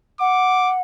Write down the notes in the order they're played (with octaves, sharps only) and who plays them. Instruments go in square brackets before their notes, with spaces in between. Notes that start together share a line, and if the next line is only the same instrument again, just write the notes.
[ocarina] F#5 [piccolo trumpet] D6